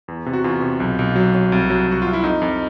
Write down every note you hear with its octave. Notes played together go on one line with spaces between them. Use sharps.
E2
C3
F#4
E2 F4
C3
B1
B1
F#3
F#3
C2
F#3
C2 F#4
C2 F4
E4
F2 D#4
F2